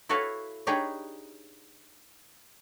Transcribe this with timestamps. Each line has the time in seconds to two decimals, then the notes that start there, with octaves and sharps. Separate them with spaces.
0.09 E4 F#4 A4 B4 C#5 F5
0.67 D4 D#4 G4 G#4 B4 C#5